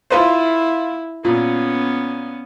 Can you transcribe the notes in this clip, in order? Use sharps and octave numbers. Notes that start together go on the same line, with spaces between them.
E4 F4 B4 C5
A#2 B3 C#4